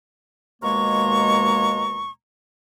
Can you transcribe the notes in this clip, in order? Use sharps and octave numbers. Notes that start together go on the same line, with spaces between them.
D#2 B2 G#3 A#3 A#5 C#6